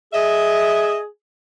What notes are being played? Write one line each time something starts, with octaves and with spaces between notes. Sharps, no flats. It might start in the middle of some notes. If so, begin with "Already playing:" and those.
G#4 D#5 E5